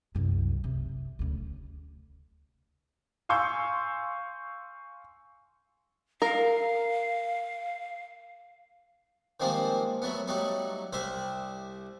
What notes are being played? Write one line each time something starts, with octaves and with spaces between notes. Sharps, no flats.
C2 F#2
C3
D2 C#3
F5 G#5 C6 C#6 E6 G6
A#4 F5
D#3 F3 G3 G#3 A#3 C4
F#3 A3 B3
F#3 G3 A3 D#4
C2 G3 C5 E5